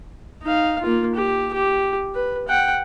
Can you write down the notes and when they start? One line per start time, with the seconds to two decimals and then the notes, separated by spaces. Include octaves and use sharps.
0.43 D#4 F5
0.81 A#3 F4
1.15 G4
1.54 G4
2.15 B4
2.48 F#5 G5